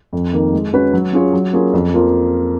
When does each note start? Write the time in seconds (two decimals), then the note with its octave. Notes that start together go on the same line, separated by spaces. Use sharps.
0.13 F2
0.33 D#3 A#3
0.53 G#3
0.73 C#4 F#4 B4
0.93 F#3
1.13 C#4 F4 G#4 C#5
1.33 F#3
1.53 A#3 C#4 F4 G#4
1.73 F2
1.94 F3 A#3 F4